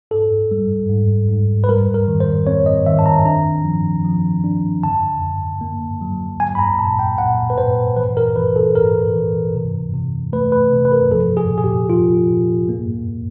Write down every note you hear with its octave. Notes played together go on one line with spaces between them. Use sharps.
G#2 A4
G3
G#2
G#2
B4
G3 A#4
A#4
D#3
C5
C4 C#5
D#5
D#3 E5
A5
A#5
D4 A#5
F3
F3
D4
D3 A5
F#2
A#3
F#3
F#3 G#5
B5
A#5
A#2 A5
G5
A#2 F#5
B4
A#2 C5
E3 B4
A#4
E3 B4
A4
G#2 A#4
E3
C3
C3
A3 B4
B4
C3
B4
A#4
F3 A4
G#4
A#2
G#4
G4
F3 F4
A#2
A#3